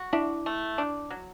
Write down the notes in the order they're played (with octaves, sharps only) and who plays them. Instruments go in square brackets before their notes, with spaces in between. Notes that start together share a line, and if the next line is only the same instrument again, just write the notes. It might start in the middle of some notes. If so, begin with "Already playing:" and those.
Already playing: [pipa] F#4
[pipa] D4 [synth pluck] E4
[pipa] A3
D4
F#3